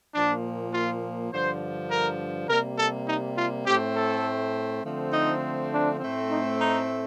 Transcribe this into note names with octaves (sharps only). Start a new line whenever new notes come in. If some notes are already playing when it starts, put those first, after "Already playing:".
A#2 F3 A#3 D4
F4
G2 D3 F3 C5
A#4
C3 G3 A#3 A#4
A4
D#4
F4
A2 A3 C4 G4
A4
D3 F3 A3 C4
D#4
D4
A2 A3 C4
D#4
D#4